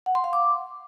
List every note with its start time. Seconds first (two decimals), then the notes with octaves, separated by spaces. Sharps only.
0.06 F#5
0.15 C6
0.24 F5
0.33 D6